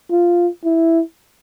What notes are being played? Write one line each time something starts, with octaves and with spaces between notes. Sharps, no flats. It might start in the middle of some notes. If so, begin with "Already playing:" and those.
F4
E4